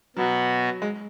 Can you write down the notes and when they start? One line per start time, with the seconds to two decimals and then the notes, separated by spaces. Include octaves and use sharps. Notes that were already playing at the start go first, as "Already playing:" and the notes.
0.17 B2 F#3 B3 F#4
0.82 G#3